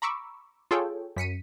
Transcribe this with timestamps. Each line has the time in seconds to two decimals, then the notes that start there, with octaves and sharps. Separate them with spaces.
0.02 A#5 B5 C#6 D6 E6
0.71 F4 G#4 A4 C#5 G5
1.17 F#2 B6 C#7 D#7